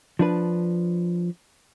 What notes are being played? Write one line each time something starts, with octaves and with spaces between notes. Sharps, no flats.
F3 D4 B4